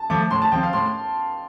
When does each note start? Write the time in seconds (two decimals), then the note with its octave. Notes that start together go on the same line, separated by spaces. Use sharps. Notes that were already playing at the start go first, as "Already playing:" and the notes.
Already playing: A5
0.10 F3 A3 D6
0.31 A2 C6
0.42 A5
0.52 F3 C4 G5
0.63 F5
0.73 A2 C6